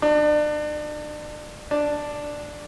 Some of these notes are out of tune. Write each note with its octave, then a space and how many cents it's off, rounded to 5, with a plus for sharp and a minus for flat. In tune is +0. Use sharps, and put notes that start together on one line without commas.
D4 +35
D4 +5